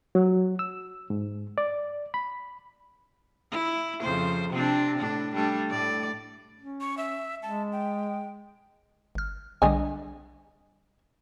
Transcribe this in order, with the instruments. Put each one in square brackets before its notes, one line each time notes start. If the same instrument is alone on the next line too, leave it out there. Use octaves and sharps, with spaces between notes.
[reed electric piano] F#3
E6
G#2
D5
B5
[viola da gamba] E4
F2 C#3 C5
C3 C4 D4
A2 D4
G3 A3 D4
A2 D5
[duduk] C#4
[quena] C#6
E5
[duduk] G#3 [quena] A5
[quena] G5
[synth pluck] G1 F6
[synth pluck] B1 D3 G3 [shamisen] D4 D#5 G#5